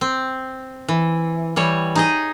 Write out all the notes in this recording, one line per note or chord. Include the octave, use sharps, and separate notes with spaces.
C4
E3
E3 G3 C#5
D#4 G#4 D#5